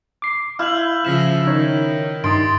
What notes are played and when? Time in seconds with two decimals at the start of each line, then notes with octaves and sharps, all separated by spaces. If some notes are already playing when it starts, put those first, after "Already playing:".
0.22 D6 C7
0.59 E4 F5 F6 G6 F#7
1.05 C#3 F3 A#6 B6 E7
1.47 D#3 D#4 C#5
2.24 G2 D#4 C6 D#6 A6 D7